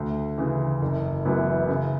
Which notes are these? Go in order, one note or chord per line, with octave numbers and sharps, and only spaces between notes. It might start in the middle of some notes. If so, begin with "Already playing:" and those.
Already playing: D2
C#3 E3
F#1
F#2 E3 B3 E4
C#3